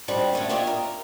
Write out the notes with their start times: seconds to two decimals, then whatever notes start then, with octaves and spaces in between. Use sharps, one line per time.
0.08 G3 G#3 C4 D4 F#4
0.33 D3 A3 C#4
0.49 D4 F4 G4 C#5 D#5 E5
0.67 A#4